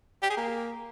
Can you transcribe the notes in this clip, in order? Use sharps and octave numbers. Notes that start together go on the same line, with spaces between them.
G4
G#4
A#3